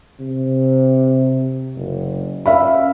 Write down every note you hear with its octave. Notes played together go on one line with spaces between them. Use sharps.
C3
F#1
C#4 E5 F5 B5